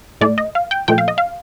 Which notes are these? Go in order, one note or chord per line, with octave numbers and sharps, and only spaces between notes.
A2 A3 D5
D#5
F5
G5
A#2 F3 A3 G5
F5
D#5
F5